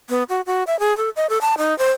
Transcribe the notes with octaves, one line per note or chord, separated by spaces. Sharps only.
B3
F#4
F#4
E5
G#4
A4
D#5
A4
A5
D#4
C5